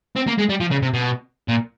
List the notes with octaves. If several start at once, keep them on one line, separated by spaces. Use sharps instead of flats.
C4
A#3
G#3
G3
F3
C#3
C3
B2
A#2